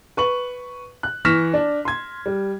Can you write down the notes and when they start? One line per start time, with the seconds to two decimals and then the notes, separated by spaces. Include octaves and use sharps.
0.17 B4 C#6 F#7
1.03 F#6
1.25 E3 C#6 F6 A#6 B6 E7
1.54 D4
1.85 C6 G#6
2.26 G3